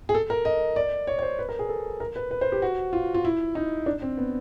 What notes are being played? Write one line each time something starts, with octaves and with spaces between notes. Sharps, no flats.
G#4
A4
A#4
D#5
D5
C#5
C#5
C5
B4
A#4
G#4
A4
A#4
B4
B4
C5
G4
F#4
F4
F4
E4
D#4
D4
C4
B3